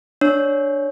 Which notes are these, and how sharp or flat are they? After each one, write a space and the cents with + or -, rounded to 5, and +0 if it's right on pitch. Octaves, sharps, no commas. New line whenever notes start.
D4 +0 C#5 +0